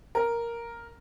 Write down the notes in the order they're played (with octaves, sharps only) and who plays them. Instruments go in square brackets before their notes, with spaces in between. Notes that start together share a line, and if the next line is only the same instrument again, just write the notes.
[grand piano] A#4